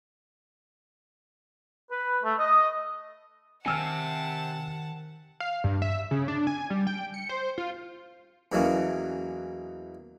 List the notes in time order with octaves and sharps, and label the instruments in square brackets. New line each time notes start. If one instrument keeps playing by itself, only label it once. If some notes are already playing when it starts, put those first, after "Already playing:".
[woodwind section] B4
A3
D#5
[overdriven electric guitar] C3 [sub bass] D#3 [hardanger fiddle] F#5 A5 [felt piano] G#5 E6 F6
[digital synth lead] F5
G2
E5
C#3
D4
G#5
G3
G5
C#7
C5
F4
[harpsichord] E2 B2 E3 F#3 A#3 C#4